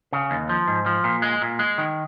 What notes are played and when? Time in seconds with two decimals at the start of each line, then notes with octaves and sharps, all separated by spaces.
0.12 C#3
0.31 D#2
0.49 F3
0.67 G#2
0.86 F3
1.04 A#2
1.22 G#3
1.42 A#2
1.59 G#3
1.78 D#3